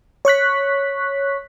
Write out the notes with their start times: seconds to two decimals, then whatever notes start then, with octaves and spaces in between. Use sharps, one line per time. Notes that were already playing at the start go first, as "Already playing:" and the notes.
0.25 C#5 C#6 F#6 B6